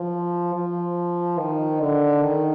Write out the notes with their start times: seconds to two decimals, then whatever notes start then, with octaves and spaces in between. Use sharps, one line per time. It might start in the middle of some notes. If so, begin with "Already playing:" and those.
Already playing: F3
0.55 F3
1.38 D#3
1.80 D3
2.22 D#3